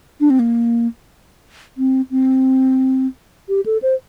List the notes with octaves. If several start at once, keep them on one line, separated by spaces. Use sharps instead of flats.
D4
C4
A#3
C4
C4
G4
A4
C5